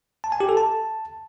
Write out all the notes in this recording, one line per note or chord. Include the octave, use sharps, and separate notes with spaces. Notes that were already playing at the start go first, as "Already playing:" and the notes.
A5
G#5
G4
A4
A5